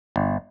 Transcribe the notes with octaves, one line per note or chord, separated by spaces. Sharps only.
G1